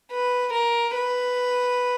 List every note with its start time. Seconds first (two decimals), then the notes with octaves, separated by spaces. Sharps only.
0.12 B4
0.54 A#4
0.96 B4